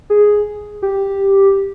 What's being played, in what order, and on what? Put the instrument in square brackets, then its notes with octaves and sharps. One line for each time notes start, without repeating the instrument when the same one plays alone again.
[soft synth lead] G#4
G4